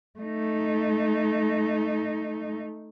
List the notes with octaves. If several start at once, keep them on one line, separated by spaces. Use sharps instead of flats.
A3 D#4